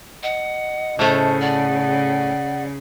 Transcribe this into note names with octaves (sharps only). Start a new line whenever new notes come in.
D#5 F#5
A2 C#3 A3 C5
D5 F#5